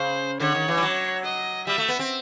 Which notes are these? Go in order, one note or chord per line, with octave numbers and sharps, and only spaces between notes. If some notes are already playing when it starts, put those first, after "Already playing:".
Already playing: C#3 C5
D3 C#5
D#3
E3
G3
F#3
D#5
G3 E5
A3
B3
C4